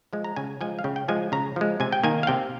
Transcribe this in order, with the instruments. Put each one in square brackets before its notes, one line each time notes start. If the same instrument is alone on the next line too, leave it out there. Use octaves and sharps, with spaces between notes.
[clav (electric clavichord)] F3 G#3
A#5
C#3 G#5
F3 G#3 G#5
F5
C#3 G5
G5
F3 G#3 G#5
C#3 A#5
F3 G#3
C3 G#5
G5
D#3 A#3 G#5
F5
C3 G5